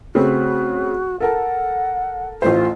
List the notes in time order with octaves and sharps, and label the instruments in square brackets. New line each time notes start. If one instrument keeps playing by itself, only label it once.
[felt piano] C#3 A3 C4 [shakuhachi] F#4
[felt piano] A4 A#4 A5 [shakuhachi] F#5
[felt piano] A1 A3 C5 [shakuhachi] F4